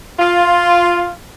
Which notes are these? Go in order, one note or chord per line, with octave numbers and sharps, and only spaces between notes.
F4